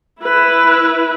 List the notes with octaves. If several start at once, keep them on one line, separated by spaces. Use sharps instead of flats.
E4 B4